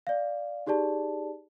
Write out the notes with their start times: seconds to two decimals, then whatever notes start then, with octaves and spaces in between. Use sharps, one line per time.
0.07 D5 F5
0.67 D#4 G4 G#4 D5 A5